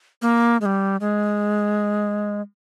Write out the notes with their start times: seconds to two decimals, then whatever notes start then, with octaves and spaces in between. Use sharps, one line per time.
0.22 A#3
0.61 G#3
0.66 G3
1.00 G#3